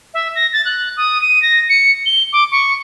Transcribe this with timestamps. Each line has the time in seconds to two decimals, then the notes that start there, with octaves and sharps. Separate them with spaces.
0.14 E5
0.35 A#6
0.53 A6
0.65 F#6
0.97 D#6
1.22 D#7
1.42 A#6
1.69 C#7
2.06 G7
2.33 D6
2.51 C#6